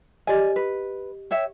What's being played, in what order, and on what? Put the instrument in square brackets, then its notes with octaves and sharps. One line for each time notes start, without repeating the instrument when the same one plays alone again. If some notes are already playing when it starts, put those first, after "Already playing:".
[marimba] G4 D#5 [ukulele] D5 G#5
[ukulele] B4
G4 C#5 E5